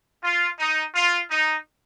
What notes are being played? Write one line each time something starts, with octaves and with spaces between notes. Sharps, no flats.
F4
D#4
F4
D#4